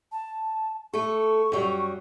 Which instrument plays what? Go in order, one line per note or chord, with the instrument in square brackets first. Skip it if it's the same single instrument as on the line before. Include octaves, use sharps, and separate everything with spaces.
[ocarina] A5
[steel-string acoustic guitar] A3 A4 [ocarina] C#6
[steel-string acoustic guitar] F#2 F#3 G3